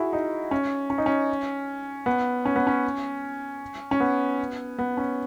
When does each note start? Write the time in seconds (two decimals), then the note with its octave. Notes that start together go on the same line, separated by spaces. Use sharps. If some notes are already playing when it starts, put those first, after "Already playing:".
Already playing: E4 F#4 G#4
0.13 D#4
0.51 C#4
0.90 C#4
0.98 D#4
1.06 C#4
2.06 B3
2.45 C#4
2.56 B3
2.67 C#4
3.91 C#4
4.00 B3
4.79 B3
4.97 C#4